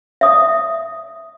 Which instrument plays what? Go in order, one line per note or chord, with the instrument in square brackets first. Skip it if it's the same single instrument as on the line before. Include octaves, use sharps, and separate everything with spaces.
[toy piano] E5 D#6